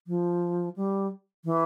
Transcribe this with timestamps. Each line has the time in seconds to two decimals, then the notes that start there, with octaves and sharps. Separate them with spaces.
0.07 F3
0.76 G3
1.45 E3